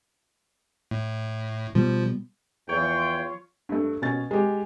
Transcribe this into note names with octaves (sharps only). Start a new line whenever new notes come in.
A2
B2 F3 G3 B3
E2 F3 F4 C#5 G5
G2 A3
B2 C#4 A6
G#3 G4